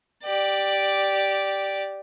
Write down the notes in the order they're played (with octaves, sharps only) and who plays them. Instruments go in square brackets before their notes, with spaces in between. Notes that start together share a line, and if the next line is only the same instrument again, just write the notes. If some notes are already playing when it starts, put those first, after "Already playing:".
[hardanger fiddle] G4 D5